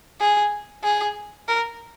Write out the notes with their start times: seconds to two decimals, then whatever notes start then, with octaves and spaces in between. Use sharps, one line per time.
0.20 G#4
0.84 G#4
1.48 A#4